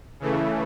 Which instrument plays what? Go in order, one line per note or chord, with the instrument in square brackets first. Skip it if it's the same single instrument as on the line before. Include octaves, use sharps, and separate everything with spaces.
[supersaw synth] C#3 E3 A3